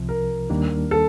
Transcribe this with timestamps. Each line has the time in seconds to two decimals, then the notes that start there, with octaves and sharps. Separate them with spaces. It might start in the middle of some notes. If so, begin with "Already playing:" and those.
Already playing: C2 C3 F3
0.09 A#4
0.50 D#2 D#3 G3 A#3 D4
0.91 A4